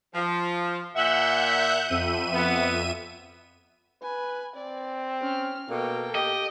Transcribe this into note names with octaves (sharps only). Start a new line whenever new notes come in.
F3
A#2 E5 F#5 F#6 G6
F2 E5 D#7
B3
B4 G#5
C4 D5
C#4 F6
B2 A#3 A4 G5
G4 D#5